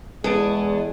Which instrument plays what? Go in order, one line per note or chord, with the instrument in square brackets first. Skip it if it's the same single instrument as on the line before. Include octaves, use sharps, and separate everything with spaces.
[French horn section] E2 [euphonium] G#3 [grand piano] B3 A5 D7 [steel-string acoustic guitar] G#4